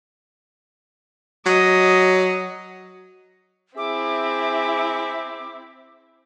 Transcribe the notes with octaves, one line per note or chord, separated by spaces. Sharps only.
F#3 D#5
C4 E4 G#4 E5 D6